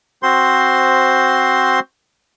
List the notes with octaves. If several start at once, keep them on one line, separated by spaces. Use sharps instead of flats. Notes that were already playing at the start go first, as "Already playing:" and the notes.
C4 F#4 C5 C6